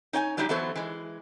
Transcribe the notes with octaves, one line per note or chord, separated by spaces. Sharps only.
D#4 C#5 G5 G#5
F#3 G3 D4 D#4 F#4 G4
E3 F#3 B3 A4 C5 C#5
E3 G#3